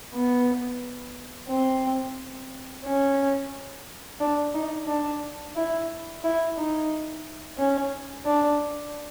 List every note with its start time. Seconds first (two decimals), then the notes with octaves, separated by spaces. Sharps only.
0.14 B3
1.50 C4
2.85 C#4
4.21 D4
4.54 D#4
4.88 D4
5.56 E4
6.24 E4
6.57 D#4
7.58 C#4
8.26 D4